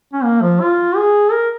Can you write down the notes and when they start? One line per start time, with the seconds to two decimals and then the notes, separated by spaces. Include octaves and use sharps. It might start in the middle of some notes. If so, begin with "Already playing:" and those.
0.13 C#4
0.24 A#3
0.42 F3
0.61 F4
0.96 G#4
1.32 A#4